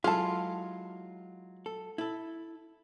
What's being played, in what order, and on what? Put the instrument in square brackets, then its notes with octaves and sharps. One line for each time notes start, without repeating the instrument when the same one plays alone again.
[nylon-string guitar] F#3 G#3 [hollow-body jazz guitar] E4 G#4 A4 [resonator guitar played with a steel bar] F4 [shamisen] F5 A5
[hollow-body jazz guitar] A4
E4 A4